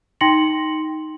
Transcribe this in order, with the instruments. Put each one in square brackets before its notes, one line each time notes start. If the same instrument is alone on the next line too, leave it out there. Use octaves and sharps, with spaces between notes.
[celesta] D#4 G5 C6 A#6 C#7 F#7